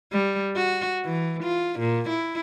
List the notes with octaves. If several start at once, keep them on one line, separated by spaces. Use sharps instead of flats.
G3
F#4
E3
F4
A#2
E4